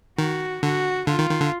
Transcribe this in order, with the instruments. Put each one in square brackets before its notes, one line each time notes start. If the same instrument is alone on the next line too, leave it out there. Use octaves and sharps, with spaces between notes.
[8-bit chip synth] D#3 [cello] F#4
[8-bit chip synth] D3 [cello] F#4
[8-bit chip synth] D3 [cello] F4
[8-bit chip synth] D#3
D#3
D3